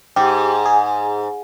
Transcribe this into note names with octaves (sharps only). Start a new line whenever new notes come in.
G#2 G4
G#4